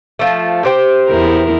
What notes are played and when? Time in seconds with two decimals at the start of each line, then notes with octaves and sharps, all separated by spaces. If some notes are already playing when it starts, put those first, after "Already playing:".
0.19 F3 A3
0.65 G4 C5 G5
1.08 E2 E4 A#4